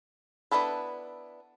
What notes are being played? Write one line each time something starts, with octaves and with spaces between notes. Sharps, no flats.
B3 D4 E4 A4 B4